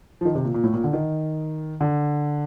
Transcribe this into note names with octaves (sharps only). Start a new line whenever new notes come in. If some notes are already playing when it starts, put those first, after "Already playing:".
F3
D#3
C3
A#2
A#2
A2
A#2
D3
D#3
D3